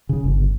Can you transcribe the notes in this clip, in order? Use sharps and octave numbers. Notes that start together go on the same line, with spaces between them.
C#3
G1